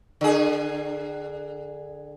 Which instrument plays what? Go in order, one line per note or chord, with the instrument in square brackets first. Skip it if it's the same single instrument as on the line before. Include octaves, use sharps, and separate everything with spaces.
[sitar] D3 G#4